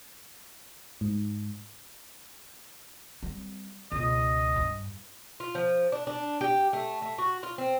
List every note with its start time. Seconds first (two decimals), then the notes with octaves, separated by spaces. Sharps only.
1.01 G#2
3.23 G3 C4
3.92 C#2 B2 D#5
4.56 G2
5.40 F4
5.55 F3
5.92 D4
6.07 D4
6.41 G4
6.73 A3
7.02 A3
7.18 F#4
7.43 F4
7.58 C4